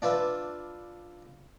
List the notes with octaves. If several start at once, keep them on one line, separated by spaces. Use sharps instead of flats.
D4 F4 B4 E5